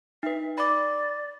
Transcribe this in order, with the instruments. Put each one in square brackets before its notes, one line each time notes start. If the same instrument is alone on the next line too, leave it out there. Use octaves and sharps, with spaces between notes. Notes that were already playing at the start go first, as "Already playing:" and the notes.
[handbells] D#4 B4 [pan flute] E5
[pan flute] D5 [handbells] B5 D6